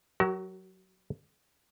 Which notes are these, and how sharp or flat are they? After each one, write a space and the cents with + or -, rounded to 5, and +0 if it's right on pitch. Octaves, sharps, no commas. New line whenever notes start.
F#3 +0 F#4 +40 A#4 +0